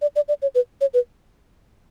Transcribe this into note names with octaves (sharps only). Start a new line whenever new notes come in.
D5
D5
D5
C#5
B4
C#5
B4